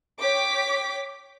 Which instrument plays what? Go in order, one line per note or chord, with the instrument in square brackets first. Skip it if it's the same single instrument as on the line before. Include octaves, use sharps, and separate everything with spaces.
[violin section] C#5 G5 D6 B6